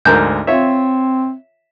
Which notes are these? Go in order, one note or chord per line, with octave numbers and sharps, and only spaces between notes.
D2 G#2 A#4 G6
C4 F4 C#5 E5